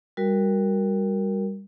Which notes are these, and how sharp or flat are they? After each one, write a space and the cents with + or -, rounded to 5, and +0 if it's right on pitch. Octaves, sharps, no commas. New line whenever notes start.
G3 +15 F#4 +0 A#4 +0